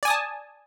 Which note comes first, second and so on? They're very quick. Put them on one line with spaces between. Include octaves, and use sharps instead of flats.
D5 G#5 D#6 A5